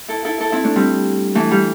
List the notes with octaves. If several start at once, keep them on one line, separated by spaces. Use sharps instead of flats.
E4 A4
E4 A4
E4 A4
C4 E4
A3 D4
G3 C4
E3 A3
G3